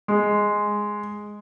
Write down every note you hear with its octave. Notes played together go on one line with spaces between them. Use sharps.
G#3